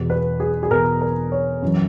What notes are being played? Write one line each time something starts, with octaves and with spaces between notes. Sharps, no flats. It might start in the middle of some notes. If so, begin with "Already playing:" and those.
Already playing: E2 B2
B4
G#4
G#4
E2 B2 A#4
A#4
C#5
F#2 E3